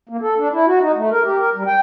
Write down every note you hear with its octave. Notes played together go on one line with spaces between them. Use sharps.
A#3
A4
D4
E4
F#4
D#4
A3
A#4
G4
A#4
G3
G5